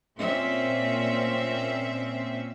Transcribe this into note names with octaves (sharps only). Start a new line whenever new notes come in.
A#2 A#3 C4 C#4 E5